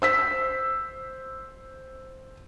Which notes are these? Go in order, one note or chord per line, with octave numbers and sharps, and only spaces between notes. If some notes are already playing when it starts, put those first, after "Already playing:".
C5 E6 B6